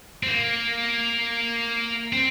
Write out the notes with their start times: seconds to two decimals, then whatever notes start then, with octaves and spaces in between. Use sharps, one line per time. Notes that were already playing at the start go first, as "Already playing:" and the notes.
0.23 C4
0.28 A#3
2.13 C4